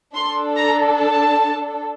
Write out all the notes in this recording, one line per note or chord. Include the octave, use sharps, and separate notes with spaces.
D4 A4 C6
A#5
A5